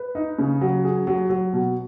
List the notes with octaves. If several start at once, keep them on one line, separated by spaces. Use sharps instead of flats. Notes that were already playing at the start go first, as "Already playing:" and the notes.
Already playing: B4
D#4
C#3
F#3
G#4
F#3
F#3
B2